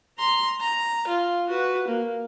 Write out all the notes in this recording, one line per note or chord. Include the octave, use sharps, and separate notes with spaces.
A#5 C6
A#5
F4
F#4 B4
A#3